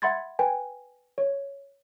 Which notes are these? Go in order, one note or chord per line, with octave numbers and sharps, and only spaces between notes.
E5 F#5 B5 C6 G#6 A6
B4 G5 G#5
C#5